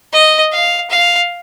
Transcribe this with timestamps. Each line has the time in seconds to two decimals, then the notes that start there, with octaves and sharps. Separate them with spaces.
0.13 D#5
0.52 F5
0.90 F5